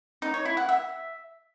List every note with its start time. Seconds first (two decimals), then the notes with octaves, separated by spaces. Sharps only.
0.22 D#4
0.34 C#5
0.45 E4
0.57 F#5
0.69 E5